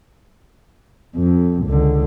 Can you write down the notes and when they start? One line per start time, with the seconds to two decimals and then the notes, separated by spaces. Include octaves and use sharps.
1.16 F2
1.66 C#2 D3